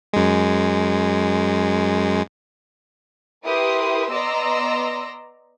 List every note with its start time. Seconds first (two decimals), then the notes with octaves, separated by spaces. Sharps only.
0.13 F#2 G#3
3.44 E4 G4 A#4 B4 C6 D#6
4.11 B3 D5 D#5 A#5 C6 E6